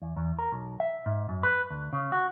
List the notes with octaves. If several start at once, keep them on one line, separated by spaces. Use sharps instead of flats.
E2
E2
A#4
B1
E5
G#2
F#2
B4
D2
C#3
F#4